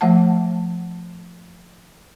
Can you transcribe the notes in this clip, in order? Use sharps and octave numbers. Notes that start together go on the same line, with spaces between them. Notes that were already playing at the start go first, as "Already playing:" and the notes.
F3 A3 F#5 A5